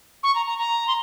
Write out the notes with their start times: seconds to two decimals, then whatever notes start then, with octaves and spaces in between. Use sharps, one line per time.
0.23 C#6
0.35 A#5
0.46 A#5
0.59 A#5
0.88 C6